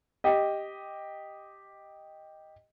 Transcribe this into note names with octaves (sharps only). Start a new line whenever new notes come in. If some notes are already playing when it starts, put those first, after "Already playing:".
G4 D#5